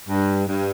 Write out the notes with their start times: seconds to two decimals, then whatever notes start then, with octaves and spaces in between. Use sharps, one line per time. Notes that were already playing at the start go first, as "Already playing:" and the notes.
0.08 G2
0.47 G2